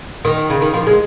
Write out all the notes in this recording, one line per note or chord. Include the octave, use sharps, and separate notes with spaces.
D#3
C#3
D#3
F3
G#3